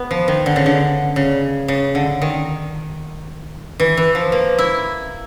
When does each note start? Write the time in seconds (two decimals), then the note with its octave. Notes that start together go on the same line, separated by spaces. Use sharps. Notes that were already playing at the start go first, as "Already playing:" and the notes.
Already playing: B3
0.11 F3
0.28 D#3
0.46 D3
0.56 C#3
0.66 D3
1.16 C#3
1.68 C#3
1.95 D3
2.22 D#3
3.80 E3
3.97 E3
4.15 F3
4.32 A#3
4.58 E4